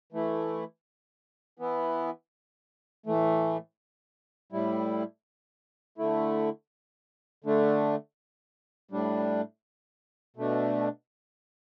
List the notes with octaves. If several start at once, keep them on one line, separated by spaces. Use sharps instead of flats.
E3 A3 E4
E3 B3 E4
A2 E3 A3
A2 G3 E4
D3 A3 E4
D3 A3 D4
A2 G3 D4
B2 A3 D4